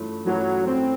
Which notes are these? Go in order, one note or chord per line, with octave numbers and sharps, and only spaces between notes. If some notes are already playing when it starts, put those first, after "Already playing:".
Already playing: G2 E3 A3 C#4 F4
G2 E3 F#3 A3 C#4 F4
C4